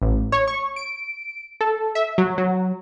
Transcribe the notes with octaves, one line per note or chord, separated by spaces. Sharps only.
A1
C#5
C#6
D7
A4
E5
F#3
F#3